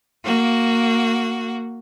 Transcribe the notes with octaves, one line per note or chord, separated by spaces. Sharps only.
A#3 F#4